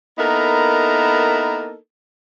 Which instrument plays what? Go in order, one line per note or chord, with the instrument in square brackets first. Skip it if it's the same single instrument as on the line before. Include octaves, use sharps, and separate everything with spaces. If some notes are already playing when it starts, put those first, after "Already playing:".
[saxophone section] A#3 B3 D#4 E4 A4 A#4